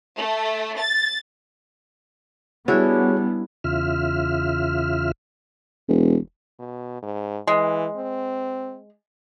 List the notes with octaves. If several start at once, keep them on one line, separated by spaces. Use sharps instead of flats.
A3
A6
G3 B3 C#4 D4 E4 F#4 G#4 C#5
E2 C#3 F4 E5 F6
E1
B2
G#2
E3 G#3
C4